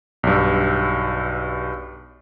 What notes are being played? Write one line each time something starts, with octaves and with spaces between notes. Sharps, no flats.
B1 G2